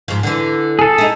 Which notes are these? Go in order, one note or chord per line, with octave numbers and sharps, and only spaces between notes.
G#2 F3
D3 E3
G#4 A4
D#4 E4